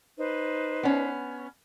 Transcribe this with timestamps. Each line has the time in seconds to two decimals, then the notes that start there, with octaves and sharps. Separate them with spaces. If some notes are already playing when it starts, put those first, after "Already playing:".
0.18 D#4 B4 C5
0.83 B3 C#4